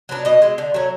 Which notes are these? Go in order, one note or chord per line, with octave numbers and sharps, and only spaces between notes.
F#3 B3 D4
B2 D#5
G#3 C4
D3
F#3 A3 C#4